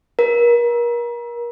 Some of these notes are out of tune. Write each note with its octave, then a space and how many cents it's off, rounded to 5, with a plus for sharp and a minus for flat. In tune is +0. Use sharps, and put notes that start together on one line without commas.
A#4 +35